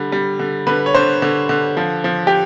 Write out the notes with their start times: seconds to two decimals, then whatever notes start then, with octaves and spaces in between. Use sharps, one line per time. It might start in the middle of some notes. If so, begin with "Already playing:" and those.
Already playing: D3 G3
0.12 G3
0.39 D3
0.67 D3 B4
0.86 C#5
0.94 D3 C5
1.22 D3
1.49 D3
1.77 F3
2.04 F3
2.27 G4